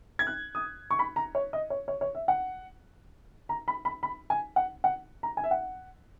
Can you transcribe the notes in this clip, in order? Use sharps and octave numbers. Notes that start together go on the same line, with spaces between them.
G#6
F#6
D#6
C#6
B5
A#5
C#5
D#5
C#5
C#5
C#5
E5
F#5
A#5
B5
B5
B5
G#5
F#5
F#5
A#5
G#5
E5
F#5